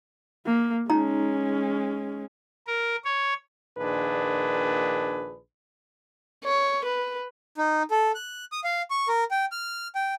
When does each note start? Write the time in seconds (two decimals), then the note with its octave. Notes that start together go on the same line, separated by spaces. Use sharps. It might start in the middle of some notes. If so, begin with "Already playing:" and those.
0.46 A#3
0.90 G#3 C#4 D#4 A#5
2.67 A#4
3.05 C#5
3.78 A#1 A#2 D#3 D4 G#4 B4
6.44 C#5
6.85 B4
7.57 D#4
7.91 A4
8.15 F#6
8.52 D#6
8.64 F5
8.90 C#6
9.08 A#4
9.31 G5
9.52 F6
9.95 G5